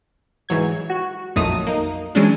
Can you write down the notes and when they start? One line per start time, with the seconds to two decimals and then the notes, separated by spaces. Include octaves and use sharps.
0.49 G#2 E3 F#3 G#6
0.90 F#4
1.36 A#1 F2 D#3 F#3 A3 D#6
1.66 A#3 D#4
2.15 E3 F#3 G#3 C#4 D4